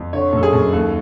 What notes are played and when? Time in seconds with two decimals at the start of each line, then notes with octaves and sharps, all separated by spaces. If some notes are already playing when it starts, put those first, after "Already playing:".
Already playing: F2
0.13 D3 C#5
0.33 F#2 A4
0.43 G#4
0.53 F#2
0.72 D#2 A4